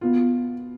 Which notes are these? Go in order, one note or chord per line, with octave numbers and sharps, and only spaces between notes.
B2 B3 F4